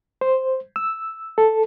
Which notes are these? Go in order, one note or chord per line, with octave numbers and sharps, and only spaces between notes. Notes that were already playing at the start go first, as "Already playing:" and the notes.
C5
E6
A4